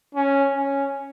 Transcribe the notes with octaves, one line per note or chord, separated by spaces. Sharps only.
C#4
C#4